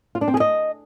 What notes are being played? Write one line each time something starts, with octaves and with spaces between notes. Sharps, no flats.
F4
D4
C4
G#4
D#5